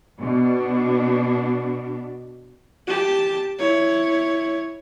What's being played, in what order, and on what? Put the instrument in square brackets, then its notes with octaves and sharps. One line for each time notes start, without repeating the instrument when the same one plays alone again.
[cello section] B2 D4
[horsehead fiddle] G4 A5
E4 C#5